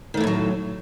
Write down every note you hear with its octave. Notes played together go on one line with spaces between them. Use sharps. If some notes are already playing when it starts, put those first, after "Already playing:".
A2 D#3 E3 F#3 A3